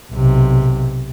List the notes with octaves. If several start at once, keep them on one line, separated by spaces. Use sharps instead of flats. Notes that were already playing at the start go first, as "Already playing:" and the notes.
B1 C3